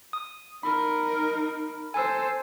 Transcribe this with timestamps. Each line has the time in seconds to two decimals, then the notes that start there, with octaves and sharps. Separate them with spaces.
0.13 D#6
0.63 D#4 A#4 B5
1.94 A4 C5 G#5 E6